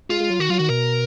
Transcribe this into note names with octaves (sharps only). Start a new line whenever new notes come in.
G#3 F4
G#3
F#3
D#3 F#4
F#3 F4
D#3 F#4
B2 A#4